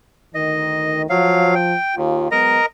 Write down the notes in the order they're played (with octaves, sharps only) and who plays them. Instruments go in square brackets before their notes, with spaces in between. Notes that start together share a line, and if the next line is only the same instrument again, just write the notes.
[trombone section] D2 D#3 [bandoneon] D#5
[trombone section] F3 [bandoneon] F#3 F5
[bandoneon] G5
[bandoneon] D#2 [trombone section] F4
[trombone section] F#3 G#3 B3 [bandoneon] A#4 D#5 A#5